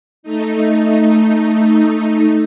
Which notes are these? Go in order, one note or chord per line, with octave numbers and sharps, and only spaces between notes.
A3 D#4